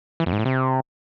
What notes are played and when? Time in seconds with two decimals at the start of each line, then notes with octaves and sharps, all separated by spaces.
0.20 E3
0.26 F2
0.33 G#2
0.39 A2
0.45 C3